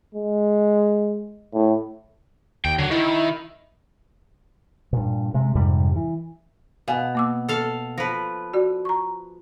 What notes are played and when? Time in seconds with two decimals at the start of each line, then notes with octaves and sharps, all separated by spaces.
0.15 G#3
1.53 A2
2.65 D#2 G5
2.79 D3 F#3
2.91 D#3 E4
4.93 G2 A#2
5.34 C3 G#3
5.55 F2 G#2 C3 G3
5.96 E3
6.88 B2 F5 G#5
7.15 A#3 D6 E6
7.49 A4 F5
7.98 F3 B4 A#6
8.54 F#4 D5
8.85 A#5 C#6